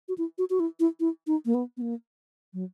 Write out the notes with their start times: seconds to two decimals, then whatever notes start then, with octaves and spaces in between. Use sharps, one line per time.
0.08 F#4
0.18 E4
0.38 F#4
0.50 F#4
0.60 E4
0.80 E4
1.00 E4
1.27 D#4
1.46 A#3
1.54 B3
1.77 B3
1.82 A#3
2.54 F#3